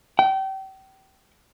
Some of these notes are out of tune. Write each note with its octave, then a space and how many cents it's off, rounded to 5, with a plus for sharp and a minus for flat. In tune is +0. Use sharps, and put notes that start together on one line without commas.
G5 -30